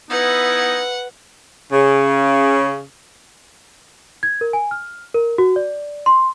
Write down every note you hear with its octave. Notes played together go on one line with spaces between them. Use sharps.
B3 D#4 E4 B4 F#5
C#3
G#6
A#4
G#5
F6
A#4
F#4
D5
C6